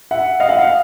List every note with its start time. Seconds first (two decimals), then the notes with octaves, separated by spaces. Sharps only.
0.11 E5 F#5
0.40 D#5 F5
0.49 E5 F#5
0.58 D#5 F5